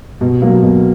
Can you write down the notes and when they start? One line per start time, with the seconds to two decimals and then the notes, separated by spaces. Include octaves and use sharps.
0.21 B2
0.42 F#3 A#3
0.63 B2